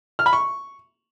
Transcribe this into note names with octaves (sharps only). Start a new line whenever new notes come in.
F6
B5
C#6